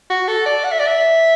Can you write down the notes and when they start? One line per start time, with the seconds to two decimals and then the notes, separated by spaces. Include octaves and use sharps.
0.10 F#4
0.28 A4
0.46 D5
0.64 F#5
0.71 E5
0.79 D5
0.87 E5